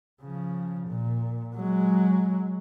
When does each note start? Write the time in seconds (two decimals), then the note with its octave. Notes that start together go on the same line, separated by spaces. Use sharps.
0.21 C#3 F3
0.88 A#2
1.55 F#3 G#3